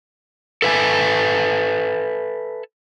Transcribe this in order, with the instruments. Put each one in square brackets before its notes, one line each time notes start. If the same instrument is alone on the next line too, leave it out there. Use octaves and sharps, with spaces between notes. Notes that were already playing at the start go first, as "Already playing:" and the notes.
[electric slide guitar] A4 B4 E5 F#5 G#5